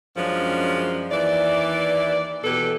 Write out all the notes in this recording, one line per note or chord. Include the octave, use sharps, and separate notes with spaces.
F#2 F3 G#3 C#4 D4
D#2 E3 D5
E2 B2 G4 A4 B4